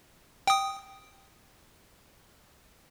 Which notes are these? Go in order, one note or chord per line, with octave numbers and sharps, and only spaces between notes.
G5 D#6